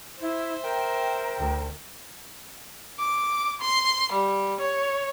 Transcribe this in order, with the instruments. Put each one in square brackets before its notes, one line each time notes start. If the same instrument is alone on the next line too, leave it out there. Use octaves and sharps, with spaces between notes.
[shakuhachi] E4 [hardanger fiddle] C5 E5
[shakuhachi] A#4 [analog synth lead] G5
[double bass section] D2
[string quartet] D6
C6
G3
C#5